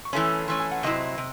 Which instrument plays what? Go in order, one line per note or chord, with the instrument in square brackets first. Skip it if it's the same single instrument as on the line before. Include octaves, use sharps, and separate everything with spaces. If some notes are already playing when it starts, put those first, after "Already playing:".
[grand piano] C#6
[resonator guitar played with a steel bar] E3 A3 C#4 [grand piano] C6
[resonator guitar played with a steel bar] E3 A3 C#4 [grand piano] C6
[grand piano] G#5
F#5
[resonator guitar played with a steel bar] C3 F#3 C4 E4 [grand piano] D#5
[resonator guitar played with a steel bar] C3